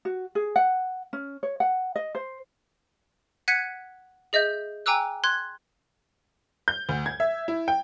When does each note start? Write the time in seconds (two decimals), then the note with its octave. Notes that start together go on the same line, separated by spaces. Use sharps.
0.05 F#4
0.35 G#4
0.56 F#5
1.13 C#4
1.43 C#5
1.60 F#5
1.96 D#5
2.15 C5
3.48 F#5 F#6 G#6 B6 C#7 D#7
4.33 G#4 D#5 E5 G6
4.86 G5 G#5 A#5 D6 E6 F#6
5.24 C6 F#6 G#6
6.68 G6
6.89 D2
7.06 G#6
7.20 E5
7.48 E4
7.68 G5